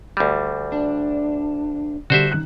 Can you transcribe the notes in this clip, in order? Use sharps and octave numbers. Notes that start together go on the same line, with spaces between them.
D2 G3
D4
D3 G3 F#4 C5 E5
D#3 F#6